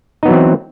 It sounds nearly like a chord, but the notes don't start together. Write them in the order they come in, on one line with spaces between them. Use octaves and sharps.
D#4 B3 F#3 E3 C4